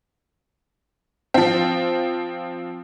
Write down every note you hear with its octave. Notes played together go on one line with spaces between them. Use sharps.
F3 C4